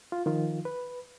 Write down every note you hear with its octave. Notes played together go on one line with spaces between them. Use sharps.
F4
D#3 F3 F4
B4